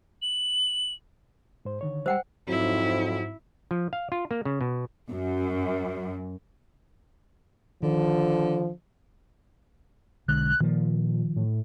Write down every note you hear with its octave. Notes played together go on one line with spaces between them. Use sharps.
F#7
G#2 C5
D3 D#3 C#5
G3 C5 F#5 G5 E6
F2 G#2 F#3 C4 E4
F3
F5
F4
A#3
C#3
B2
F#2
D3 D#3 F3
B1 D3 G#3 F#6
A#2 D#3 F3
A2